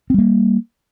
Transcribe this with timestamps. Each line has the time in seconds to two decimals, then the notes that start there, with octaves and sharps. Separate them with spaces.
0.10 C4
0.14 G3
0.18 A#3